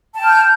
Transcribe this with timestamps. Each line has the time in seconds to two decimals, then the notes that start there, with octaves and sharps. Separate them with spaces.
0.15 A5
0.19 G5
0.24 F6
0.28 G6